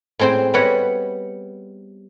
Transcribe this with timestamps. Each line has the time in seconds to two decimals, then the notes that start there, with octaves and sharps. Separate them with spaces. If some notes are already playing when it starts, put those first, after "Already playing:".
0.19 A2 G#3 C4 C5 G5
0.54 G3 B3 B4 C#5 D#5 F#5